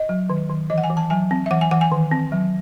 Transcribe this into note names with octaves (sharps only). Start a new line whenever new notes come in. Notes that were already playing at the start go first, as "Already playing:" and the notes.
Already playing: D#5
F#3
D#3
D#3
E3 D#5
F#5
G#5
E3
A5
F#3 G#5
C4
E5
E3 F#5
G#5
E3 F#5
G#5
D#3
C4
F#3